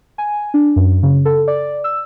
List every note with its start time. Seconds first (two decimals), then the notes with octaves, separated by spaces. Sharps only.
0.18 G#5
0.54 D4
0.76 F#2
1.03 C#3
1.25 A4
1.48 D5
1.84 E6